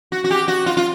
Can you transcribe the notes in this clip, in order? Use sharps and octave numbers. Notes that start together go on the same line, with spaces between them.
F#4
F#4
G4
F#4
F4
F4